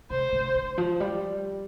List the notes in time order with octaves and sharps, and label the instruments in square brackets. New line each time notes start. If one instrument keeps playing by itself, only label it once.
[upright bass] C3 [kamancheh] C5
[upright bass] D3
D3
F3
G3